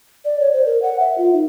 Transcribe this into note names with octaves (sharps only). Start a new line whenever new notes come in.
D5
C#5
C5
A#4
F#5
E5
F4
D#4